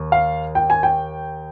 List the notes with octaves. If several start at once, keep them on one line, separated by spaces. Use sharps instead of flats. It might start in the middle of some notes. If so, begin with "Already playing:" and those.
Already playing: D#2
F5
G5
G#5
G5